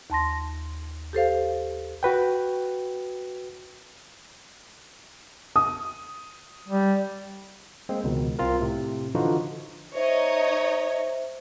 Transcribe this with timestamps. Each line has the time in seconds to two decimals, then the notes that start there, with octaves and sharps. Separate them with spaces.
0.10 D#2 A5 C6 A#6
1.13 G4 A4 C5 F5
2.03 F#4 B4 G5
5.56 D#6
6.68 G3
7.89 G#3 A#3 C4
8.04 C#2 B2 D#3
8.39 C2 C4 F4 A#4
8.60 A2 C3
9.15 D3 E3 F3 D#4 F4 F#4
9.95 D#4 C5 C#5 D#5 E5